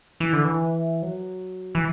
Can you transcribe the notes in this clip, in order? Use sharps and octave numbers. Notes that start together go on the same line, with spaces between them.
E3
D3
E3
F#3
E3